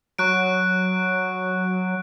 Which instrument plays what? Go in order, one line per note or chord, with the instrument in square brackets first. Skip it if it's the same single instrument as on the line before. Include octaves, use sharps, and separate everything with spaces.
[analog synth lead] F#3 [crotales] C#6 F#6 D7